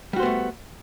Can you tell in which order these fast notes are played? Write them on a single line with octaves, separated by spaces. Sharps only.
G3 F#4 C5 B3 A3